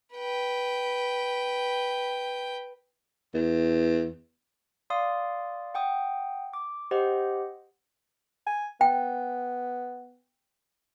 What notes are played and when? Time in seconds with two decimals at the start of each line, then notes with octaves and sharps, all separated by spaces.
0.14 B4 G5
3.34 E2
4.90 D5 F5 C6 D#6
5.75 F#5 G5 D#6
6.53 D6
6.91 G4 C5 D#5 F#5
8.47 G#5
8.81 B3 G5